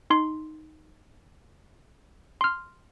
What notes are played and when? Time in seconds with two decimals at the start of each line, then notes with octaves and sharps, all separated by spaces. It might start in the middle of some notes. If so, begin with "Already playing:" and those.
0.10 D#4 C6
2.41 C6 F6